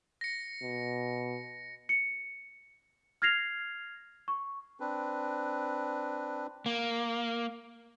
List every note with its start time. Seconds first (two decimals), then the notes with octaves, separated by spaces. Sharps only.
0.21 A#6 C#7
0.63 B2
1.89 C#7
3.22 F6 G#6 A#6 C7 F7
4.28 C#6
4.80 C4 D4 B4
6.66 A#3